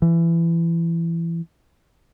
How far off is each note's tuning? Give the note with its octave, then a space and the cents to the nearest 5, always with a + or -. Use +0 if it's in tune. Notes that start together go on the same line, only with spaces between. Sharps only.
E3 +25